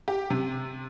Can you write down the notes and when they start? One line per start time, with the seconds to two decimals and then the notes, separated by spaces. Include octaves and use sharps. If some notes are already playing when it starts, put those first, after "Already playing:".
0.08 G4
0.30 C3